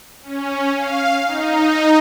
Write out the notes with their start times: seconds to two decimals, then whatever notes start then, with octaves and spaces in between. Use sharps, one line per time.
0.23 C#4
0.76 F5
1.25 D#4